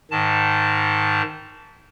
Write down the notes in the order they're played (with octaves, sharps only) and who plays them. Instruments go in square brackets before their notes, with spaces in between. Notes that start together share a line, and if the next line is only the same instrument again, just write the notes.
[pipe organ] G#2 D#3 A5